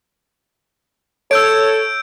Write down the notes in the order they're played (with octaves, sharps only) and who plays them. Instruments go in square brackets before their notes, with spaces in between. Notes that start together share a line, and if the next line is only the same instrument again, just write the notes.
[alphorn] A4 [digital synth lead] C#5 [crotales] E6 G6 D7